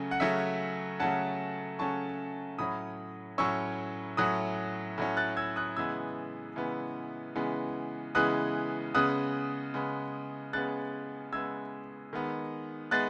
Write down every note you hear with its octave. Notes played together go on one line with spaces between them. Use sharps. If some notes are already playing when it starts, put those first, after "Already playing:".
Already playing: C#3 F#3 A3 C#4
F#5
C#3 F#3 A3 C#4 E5
C#3 F#3 A3 C#4 F#5 A5
C#3 F#3 A3 C#4 A5 C#6
A2 F#3 C#4 B5 D#6
A2 F#3 C#4 C#6 E6
A2 F#3 C#4 D#6 F#6
A2 F#3 C#4
F#6 A6
E6 G#6
D#6 F#6
C#3 E3 G#3 B3 E6 G#6
C#3 E3 G#3 B3
C#3 E3 G#3 B3
C#3 E3 G#3 B3 D#6 F#6
C#3 G#3 B3 D#6 F#6
C#3 G#3 B3
C#3 G#3 B3 F#6 A6
C#3 G#3 B3 E6 G#6
D#3 G#3 B3
G#3 B3 F#6 A6